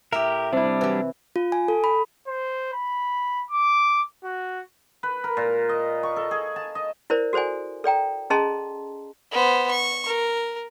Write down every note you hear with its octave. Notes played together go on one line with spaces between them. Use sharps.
A2 G4 A#4 E5
C3 G3 D4 E4
E3 F#3 G4
F4
G#5
A4
B5
C5
B5
D6
F#4
B4
A#4
A#2
D#5
C#6
A4
G#4
A5
D#5
E4 A#4 C5 D5
F#4 A4 C5 D5 G#5
A4 D5 G5 A#5
C#4 G#4 D#5 A5 A#5 C6
B3 C5
C#6
A#4